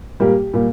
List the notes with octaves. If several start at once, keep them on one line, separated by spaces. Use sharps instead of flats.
A#2 G3 A#3 G4
A#2 G3 A#3